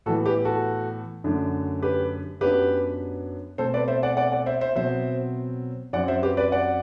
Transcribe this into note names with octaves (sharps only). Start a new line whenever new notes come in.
A2 E3 B3 F#4 A4
G4 B4
F#4 A4
F#2 D3 A3 D4
G4 B4
F#2 F#3 B3 D4 G4 B4
B2 A3 C4 A4 C5
B4 D5
C5 E5
D5 F#5
D5 F#5
D5 F#5
C5 E5
C5 E5
B2 F#3 C4 C5 E5
F#2 F#3 C4 D5 F#5
C5 E5
G4 B4
B4 D5
D5 F#5